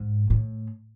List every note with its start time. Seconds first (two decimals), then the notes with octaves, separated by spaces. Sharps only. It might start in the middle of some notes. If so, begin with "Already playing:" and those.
Already playing: G#2
0.30 A2